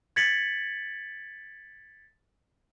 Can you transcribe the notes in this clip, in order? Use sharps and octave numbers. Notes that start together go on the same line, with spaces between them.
G#6 A6 B6 C#7 F#7